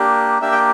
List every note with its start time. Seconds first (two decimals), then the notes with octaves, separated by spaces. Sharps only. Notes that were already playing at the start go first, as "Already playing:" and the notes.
Already playing: A#3 D4 G4
0.41 A#3 D4 G4 E5
0.52 G5